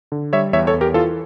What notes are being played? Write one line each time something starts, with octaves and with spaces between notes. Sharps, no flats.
D3
G3 C#5 E5
E2 C#5 E5
A4 C#5
E2
G4 A#4
E3 F4 A4